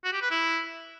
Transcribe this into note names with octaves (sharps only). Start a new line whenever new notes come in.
F#4
G4
B4
E4